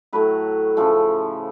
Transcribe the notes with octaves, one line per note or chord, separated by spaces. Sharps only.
A2 F#3 A3 B4
C#3 F3 A3